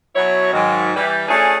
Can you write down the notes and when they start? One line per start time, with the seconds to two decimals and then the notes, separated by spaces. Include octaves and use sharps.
0.15 B2 F#3 E4 C#5
0.53 G#2 D#3 F#3
0.96 E3 G3
1.28 A3 C#4 D4 F4 G#4